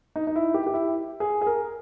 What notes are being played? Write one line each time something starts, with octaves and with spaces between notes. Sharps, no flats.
D#4
D#4
E4
G4
G4
E4
G#4
G#4
A#4